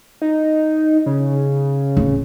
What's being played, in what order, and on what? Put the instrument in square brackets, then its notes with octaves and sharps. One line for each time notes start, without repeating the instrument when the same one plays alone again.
[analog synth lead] D#4
C#3
[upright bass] D1